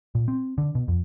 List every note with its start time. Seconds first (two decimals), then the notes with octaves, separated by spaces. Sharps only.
0.15 A#2
0.28 C4
0.58 D3
0.75 B2
0.88 F2